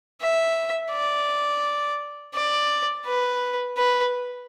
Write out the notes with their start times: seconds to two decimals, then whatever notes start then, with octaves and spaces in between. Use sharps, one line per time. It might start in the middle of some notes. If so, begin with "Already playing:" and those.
0.21 E5
0.91 D5
2.34 D5
3.06 B4
3.77 B4